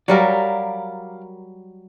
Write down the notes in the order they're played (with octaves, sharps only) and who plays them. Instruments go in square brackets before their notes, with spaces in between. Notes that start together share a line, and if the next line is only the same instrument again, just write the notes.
[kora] F#3 G3 A#4 [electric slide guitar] D5 F5